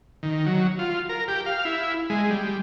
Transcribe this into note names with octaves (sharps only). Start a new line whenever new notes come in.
D#3
F#3
F4
A#4
G4
F5
E4
G#3
G3